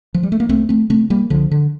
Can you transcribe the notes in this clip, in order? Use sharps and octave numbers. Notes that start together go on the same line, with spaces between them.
F3
G3
A3
A#3
C2 A3 C4
A3 C4
C3 A3 C4
G3 A#3
C2 D3 F3
D3